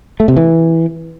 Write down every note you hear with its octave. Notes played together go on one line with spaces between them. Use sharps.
A3
C3
E3